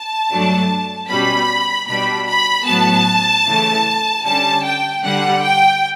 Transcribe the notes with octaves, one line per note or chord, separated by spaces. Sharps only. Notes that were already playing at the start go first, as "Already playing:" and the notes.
Already playing: A5
G2 F#3 A3 D4
B2 G3 C#4 B5
B2 G3 D4 B5
B5
A2 F#3 B3 A5
C#3 E3 A3
D3 G3 C#4 A5
G5
D3 G3 D4 F#5
G5